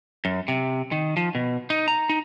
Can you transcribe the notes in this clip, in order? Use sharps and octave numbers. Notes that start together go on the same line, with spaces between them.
F#2
C3
D#3
F3
B2
D#4
A#5
D#4